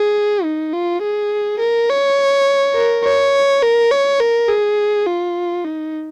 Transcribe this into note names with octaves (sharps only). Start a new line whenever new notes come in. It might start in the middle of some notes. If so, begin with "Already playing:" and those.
Already playing: G#4
D#4
F4
G#4
A#4
C#5
A#4
C#5
A#4
C#5
A#4
G#4
F4
D#4